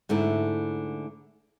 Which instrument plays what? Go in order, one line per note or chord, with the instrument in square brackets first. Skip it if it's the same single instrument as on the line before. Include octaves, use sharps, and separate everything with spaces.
[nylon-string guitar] G#2 D3 A3 E4